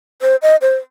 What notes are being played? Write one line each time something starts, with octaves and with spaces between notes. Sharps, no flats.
C5
D#5
C5